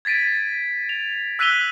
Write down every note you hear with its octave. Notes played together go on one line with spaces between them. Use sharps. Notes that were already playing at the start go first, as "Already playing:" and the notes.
G#6 A6 B6 D7 D#7
F7
E6 F#6 B6 D#7 F7 G7